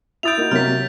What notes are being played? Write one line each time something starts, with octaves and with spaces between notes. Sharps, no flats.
E4 D#6 G6 A6 D7 F7
A#3 D#4 F#4
C3 F#3 A#3 F6 B6